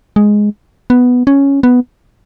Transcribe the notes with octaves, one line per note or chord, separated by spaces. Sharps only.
G#3
B3
C#4
B3